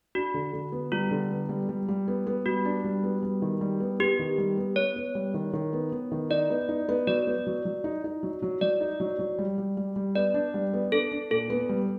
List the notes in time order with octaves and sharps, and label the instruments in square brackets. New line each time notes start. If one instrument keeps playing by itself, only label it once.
[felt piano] D4 [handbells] F#4
[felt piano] D3
D3
B3
[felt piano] G3 [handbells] F4
[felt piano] D3
B3
G3
G3
G3
B3
B3
[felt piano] G3 [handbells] F#4
[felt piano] D4
G3
B3
G3
D#3
G3
B3
[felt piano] B3 [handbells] G4
[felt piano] D#3
G3
B3
[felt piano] B3 [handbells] C#5
[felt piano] B3
G3
D#3
D#3
B3
B3
D#3
[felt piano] D#4 [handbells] D5
[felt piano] B3
D#4
B3
[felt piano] F#3 [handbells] D5
[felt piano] B3
F#3
F#3
D#4
D#4
F#3
F#3
[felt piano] F#3 [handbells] D5
[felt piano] D#4
F#3
F#3
G3
G3
G3
G3
[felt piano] B3 [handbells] D5
[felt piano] D4
G3
B3
[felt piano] D4 [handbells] A4
[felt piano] D4
[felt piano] A#2 [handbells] A4
[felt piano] B3
G3